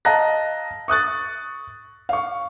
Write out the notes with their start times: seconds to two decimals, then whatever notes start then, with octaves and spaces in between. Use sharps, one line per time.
0.05 D#5 F5 A5 A#5 F#6 A#6
0.88 C#6 D#6 F#6 A6
2.09 F5 C#6